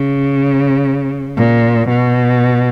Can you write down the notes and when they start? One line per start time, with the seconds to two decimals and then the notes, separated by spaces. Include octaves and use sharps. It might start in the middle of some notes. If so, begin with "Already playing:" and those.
Already playing: C#3
1.37 A#2
1.88 B2